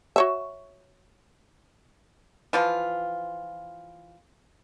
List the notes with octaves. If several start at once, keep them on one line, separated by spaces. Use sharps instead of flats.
F#4 C#5 E5
E3 F3 F4